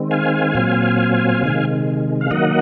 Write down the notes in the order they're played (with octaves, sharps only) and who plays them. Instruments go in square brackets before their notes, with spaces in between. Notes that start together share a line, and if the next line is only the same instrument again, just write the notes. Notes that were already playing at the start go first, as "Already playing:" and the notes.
Already playing: [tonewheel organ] D#3 G#3 C4
F5 G#5
A#2 F#3 C4
C3 D#3 G#3
F5
D#3 F#3 A#3 D#5 F#5